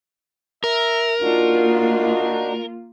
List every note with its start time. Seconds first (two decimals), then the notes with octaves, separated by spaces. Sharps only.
0.64 A#4 E5
1.21 A#3 D4 D#4 F4 F#4